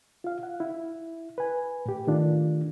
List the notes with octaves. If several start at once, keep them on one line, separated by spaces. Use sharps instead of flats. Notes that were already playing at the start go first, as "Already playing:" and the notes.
F4 F5
F#5
E4
B4 G#5
A2 G4
D#3 A3 D4 F4